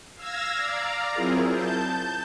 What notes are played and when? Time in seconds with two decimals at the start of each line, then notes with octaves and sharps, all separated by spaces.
0.15 F5 E6 G#6 A#6
0.55 D5 F5 A#5
1.13 F#3 C4 E4 F4 G#4 A#4
1.50 A5 G6